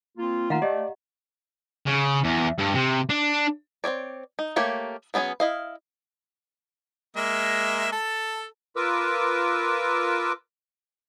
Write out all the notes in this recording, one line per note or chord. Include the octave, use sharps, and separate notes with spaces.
A#3 C4 F4
D#3 A3 A#3 F4 F5 F#5 A#5
A3 G4 D5 D#5
C#3
E2
G2
C3
D4
C4 C#4 C#5 D5
D#4
A3 A#3 G4 C#5
F#3 B3 C#4 E4 G#4
E4 D#5 F5
G#3 A#3 E5
A4 A5
F4 A#4 B4 D6 E6